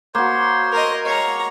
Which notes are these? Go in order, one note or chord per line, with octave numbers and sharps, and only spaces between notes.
A#3 F#4 C5 C#5 C6
A#4 D#5
G#3 C#5 F5 A#5 C#6